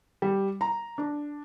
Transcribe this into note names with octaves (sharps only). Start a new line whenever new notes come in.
G3
A#5
D4